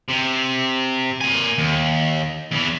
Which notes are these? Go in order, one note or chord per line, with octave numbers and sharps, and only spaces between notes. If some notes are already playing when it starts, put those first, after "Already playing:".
C3
A#3 G#5
D#2
E2 E3